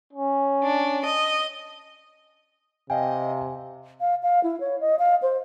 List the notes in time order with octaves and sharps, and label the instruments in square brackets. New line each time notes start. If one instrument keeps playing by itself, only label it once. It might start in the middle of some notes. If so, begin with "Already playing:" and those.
[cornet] C#4
[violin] D4
D#5
[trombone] C3 [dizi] D#5 [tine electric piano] F5 G5 [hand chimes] G#5
[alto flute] F5
F5
E4
C#5
D#5
F5
C5